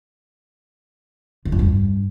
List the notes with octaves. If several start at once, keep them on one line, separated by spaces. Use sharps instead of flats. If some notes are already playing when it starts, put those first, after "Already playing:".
D3
F2
G2